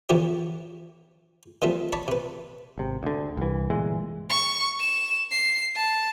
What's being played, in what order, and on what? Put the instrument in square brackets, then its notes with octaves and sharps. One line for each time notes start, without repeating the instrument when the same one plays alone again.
[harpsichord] E2 D3 F3 E4 G4 C#5
D#3 F3 G3 A3 C4
C#5 D5 A5 B5
C3 B4
[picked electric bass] G#1 C3
D2 D3
C2 E3
G1 A#2 E3 G#3
[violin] C#6
E7
C7
A5